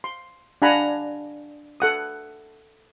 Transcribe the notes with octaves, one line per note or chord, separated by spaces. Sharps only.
C6
D4 F5 F#5 G#5 A#5 B5
A4 F#5 D#6